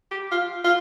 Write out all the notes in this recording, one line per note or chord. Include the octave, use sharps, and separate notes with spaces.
G4
F4
F4